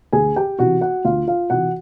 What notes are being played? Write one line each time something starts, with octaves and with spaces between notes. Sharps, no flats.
D2 G#4 G#5
G4 G5
C3 E3 F#4 F#5
F#4 F#5
D2 F4 F5
F4 F5
C3 E3 F#4 F#5